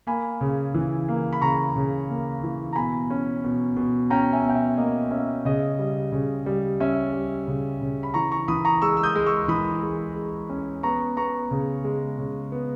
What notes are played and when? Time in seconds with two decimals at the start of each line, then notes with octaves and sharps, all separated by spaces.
0.07 A#3 G#5 B5
0.41 C#3
0.74 E3
1.09 A#3
1.33 B5
1.41 C#3 A#5 C#6
1.76 C#3
2.10 A#3
2.43 E3
2.73 A#5
2.76 B2 G#5 B5
3.10 C#4
3.44 B2
3.77 B2
4.10 C#4 G5 A#5
4.33 E5 G#5
4.44 B2
4.49 G5
4.55 E5
4.77 A#3 D#5
5.11 C#4 E5
5.45 C#3 D#5
5.79 G3
6.12 C#3
6.46 G3
6.80 C#4 E5
7.13 G3
7.48 C#3
7.81 C#3
8.03 B5
8.14 E3 A#5 C#6
8.31 A#5 C#6
8.48 E3 B5 D#6
8.65 A#5 C#6
8.81 G#3 C#6 E6
8.97 E6
9.03 D#6 G6
9.15 G#3
9.26 C#6 E6
9.48 E3 B5 D#6
9.82 G#3
10.16 G#3
10.49 C#4
10.83 B3 A#5 C#6
11.17 B3 A#5 C#6
11.51 C#3
11.84 G#3
12.18 C#3
12.52 B3